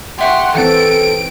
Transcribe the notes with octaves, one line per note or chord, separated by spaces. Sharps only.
G4 E5 F#5 C6 C#6
E3 C4 A4 D7